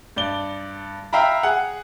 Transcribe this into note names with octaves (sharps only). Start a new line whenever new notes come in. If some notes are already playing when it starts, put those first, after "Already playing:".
G2 D5 G7
E5 F5 G5 A#5 B5
G#4 F#5